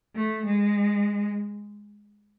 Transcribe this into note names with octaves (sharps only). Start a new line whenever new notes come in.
A3
G#3